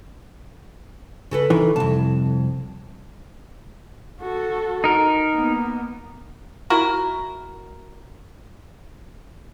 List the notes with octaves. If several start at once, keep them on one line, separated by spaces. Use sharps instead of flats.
C#3 A4 B4
D#3 E3
C2 F2 A5
F#4 A4
D#4 A#4
A#3 B3
E4 F#4 A#4